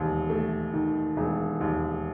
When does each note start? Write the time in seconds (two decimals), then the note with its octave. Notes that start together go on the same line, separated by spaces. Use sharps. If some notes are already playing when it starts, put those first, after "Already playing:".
Already playing: E1 D#2
0.30 A3
0.73 D#3
1.17 E1
1.61 D#2